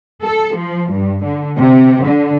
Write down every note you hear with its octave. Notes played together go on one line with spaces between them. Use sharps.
A4
F3
G2
D3
C3
D3